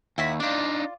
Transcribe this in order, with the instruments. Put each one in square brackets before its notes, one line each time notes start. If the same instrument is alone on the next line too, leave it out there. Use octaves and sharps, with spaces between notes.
[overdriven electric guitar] D#2 [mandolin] E4 F#4 B5
[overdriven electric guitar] D4 D#4 [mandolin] F4 D5